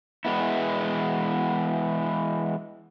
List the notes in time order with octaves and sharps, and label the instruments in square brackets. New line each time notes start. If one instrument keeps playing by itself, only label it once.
[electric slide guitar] E3 G#3 B3 E4